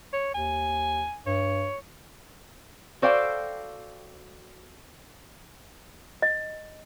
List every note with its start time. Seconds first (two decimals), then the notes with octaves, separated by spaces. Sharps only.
0.13 C#5
0.34 D#2 G#5
1.27 G2 C#5
3.02 F#4 A4 C5 D5 F5 G5
6.22 D#5